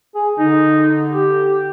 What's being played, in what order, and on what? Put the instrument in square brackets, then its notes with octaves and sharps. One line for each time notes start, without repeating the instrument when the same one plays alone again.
[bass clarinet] G#4
[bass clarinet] D3 [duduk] D#4
[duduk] G4